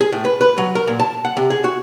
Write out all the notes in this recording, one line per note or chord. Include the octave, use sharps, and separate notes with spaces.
G#4
A2
B4
B4
F#3
A#4
A#2
A5
F#5
C3
G#4
F#4